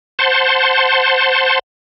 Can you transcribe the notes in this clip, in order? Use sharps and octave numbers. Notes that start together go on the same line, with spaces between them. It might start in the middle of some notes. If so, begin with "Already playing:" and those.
C5 F#5 A5 C6